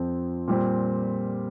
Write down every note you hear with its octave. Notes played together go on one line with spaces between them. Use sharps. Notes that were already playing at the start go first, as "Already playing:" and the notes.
Already playing: F2 F3 C4
A#2 G3 C4